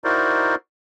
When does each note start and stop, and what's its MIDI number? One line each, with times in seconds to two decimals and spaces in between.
0.04 0.55 63
0.04 0.55 64
0.04 0.55 66
0.04 0.55 70
0.04 0.55 72
0.04 0.55 74